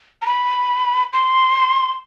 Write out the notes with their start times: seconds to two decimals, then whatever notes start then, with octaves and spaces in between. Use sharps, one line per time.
0.22 A#5
0.26 B5
1.13 C6